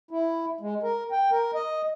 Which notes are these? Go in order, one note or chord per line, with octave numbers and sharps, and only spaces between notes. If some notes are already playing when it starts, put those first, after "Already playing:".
E4
G#3
A#4
G5
A#4
D#5